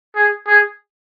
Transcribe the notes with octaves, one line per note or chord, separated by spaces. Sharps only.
G#4
G#4